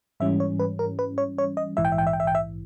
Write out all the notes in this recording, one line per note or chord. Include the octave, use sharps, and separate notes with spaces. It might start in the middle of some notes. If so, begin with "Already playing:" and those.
G#2 E3 G3 C#4 E5
C#5
B4
A#4
B4
C#5
C#5
D#5
A#1 G#2 E3 E5
G5
E5
G5
E5
G5
E5
G5
E5